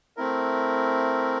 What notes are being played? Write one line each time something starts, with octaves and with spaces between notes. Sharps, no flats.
A3 C4 E4 A#4